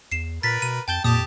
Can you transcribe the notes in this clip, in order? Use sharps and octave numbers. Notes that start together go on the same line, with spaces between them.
E2 C7 E7
A#2 A#4 B4 A6 B6
B2 D#7
F2 G5 A5 G6 G7
F2 A#2 G4 A5 D#6